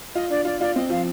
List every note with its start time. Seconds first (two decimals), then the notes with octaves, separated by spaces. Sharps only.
0.15 F4 D#5
0.30 D4 D5
0.45 F4 D5
0.61 F4 D5
0.75 C4 D#5
0.90 F3 F5